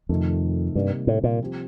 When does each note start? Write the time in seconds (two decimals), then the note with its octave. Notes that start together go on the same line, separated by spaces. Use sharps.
0.09 F2 C3 D#3 A3
0.75 G2 C3 G3 A#3 D#4 G4
1.07 A2
1.24 A#2
1.40 F3 C4 G4